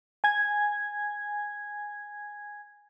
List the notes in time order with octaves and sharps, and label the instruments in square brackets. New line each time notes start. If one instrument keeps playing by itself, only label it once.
[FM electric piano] G#5 G#6